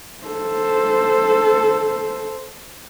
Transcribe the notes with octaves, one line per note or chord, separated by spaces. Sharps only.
A4 C5